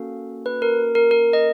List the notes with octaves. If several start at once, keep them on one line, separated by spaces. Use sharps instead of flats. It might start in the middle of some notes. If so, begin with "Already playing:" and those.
Already playing: A#3 C#4 F#4 A4 F5
B4
A#4
A#4
A#4
D#5